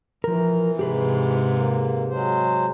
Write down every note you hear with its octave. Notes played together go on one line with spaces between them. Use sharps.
E3 F3 A#4
G#2 C3 G4 G#4 B4
A#3
F#3 G#3 C5